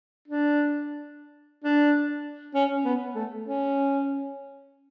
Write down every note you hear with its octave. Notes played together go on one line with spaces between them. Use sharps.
D4
D4
C#4
B3
A3
C#4